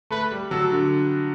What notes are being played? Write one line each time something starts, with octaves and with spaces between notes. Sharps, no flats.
A3 B4
G3
F#3 A4
D3